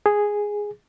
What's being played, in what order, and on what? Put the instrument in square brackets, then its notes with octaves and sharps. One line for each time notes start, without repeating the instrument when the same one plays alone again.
[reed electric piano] G#4